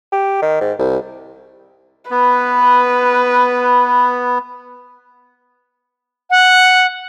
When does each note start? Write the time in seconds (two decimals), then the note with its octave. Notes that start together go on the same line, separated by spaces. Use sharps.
0.12 G4
0.42 D#3
0.60 G#2
0.79 C2
2.11 B3 B4
6.30 F#5